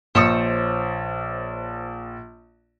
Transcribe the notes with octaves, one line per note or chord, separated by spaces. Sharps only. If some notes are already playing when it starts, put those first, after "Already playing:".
A#1 C5 C#5 D#6